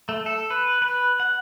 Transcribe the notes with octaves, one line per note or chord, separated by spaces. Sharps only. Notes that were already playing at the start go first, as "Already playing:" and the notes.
A3
A4
B4
B4
F#5